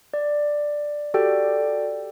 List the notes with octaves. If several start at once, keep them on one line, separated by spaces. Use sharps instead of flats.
D5
F#4 G4 A4 D5 G5